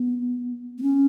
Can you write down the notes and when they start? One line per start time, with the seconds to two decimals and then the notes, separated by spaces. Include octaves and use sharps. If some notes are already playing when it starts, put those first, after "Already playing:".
Already playing: B3
0.78 B3
0.83 C#4